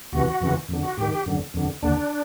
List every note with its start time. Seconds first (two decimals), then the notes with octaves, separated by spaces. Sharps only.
0.12 D2 C3 E3 F#4
0.41 F2 C#3 E3
0.69 F2 D3
0.83 F#4
0.97 G#2 D#3 G4
1.12 G4
1.26 F#2 D3
1.54 F2 D3
1.83 D#2 D3 D4